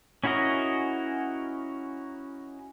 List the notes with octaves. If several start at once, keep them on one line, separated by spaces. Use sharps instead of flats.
C#4 E4 F#4 A#4 D#5